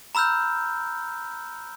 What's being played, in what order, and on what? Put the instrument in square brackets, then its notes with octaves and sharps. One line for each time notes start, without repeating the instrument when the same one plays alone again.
[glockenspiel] A#5 B5 E6 F6 G6